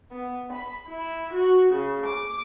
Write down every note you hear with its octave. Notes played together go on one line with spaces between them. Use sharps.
B3
B5
E4
F#4
C#3
D6